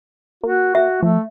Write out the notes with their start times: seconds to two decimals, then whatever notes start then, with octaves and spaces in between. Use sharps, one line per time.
0.43 A#3 F#4
0.75 F#4 E5
1.03 F3 A3